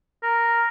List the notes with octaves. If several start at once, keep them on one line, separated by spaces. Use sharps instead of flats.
A#4